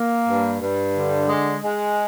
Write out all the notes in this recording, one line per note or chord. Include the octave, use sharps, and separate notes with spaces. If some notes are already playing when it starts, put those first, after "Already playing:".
Already playing: A#3
G2
G2
D3
G#3
G#3